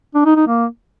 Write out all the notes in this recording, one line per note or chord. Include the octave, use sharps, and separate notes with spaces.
D4
D#4
D#4
A#3